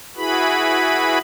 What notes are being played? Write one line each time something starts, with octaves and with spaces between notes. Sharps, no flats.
E4 F#4 G#4 B4 B5